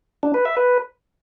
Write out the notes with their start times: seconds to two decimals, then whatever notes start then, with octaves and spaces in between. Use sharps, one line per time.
0.23 D4
0.34 B4
0.45 E5
0.57 B4